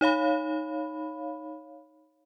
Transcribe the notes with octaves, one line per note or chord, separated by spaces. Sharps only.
D#4 C#5 F5 B5